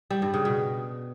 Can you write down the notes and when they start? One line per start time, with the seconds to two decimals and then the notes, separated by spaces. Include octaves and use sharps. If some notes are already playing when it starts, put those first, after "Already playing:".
0.10 G3
0.22 G2
0.34 C#3
0.45 B2